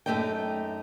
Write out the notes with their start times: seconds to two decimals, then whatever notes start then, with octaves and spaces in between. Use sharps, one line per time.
0.06 F#2 F3 A3 D#4 D5 G5